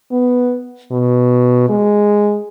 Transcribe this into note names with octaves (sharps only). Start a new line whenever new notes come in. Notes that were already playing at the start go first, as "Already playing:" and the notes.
B3
B2
G#3